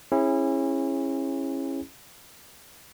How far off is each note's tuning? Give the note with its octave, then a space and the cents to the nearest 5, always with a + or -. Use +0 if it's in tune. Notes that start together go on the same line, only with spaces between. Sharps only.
C#4 -30 E4 +0 G#4 -15